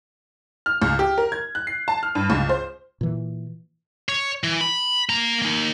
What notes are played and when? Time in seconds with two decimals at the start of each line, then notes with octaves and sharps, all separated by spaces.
0.66 F6
0.82 C#2
0.99 G4
1.18 A#4
1.32 G#6
1.55 F#6
1.67 C7
1.88 A5
2.03 F6
2.15 G2
2.30 C#2
2.49 C5
3.01 A#2 E3
4.09 C#5
4.44 E3
4.61 B5
5.09 A#3 A#5
5.42 A#3 D#4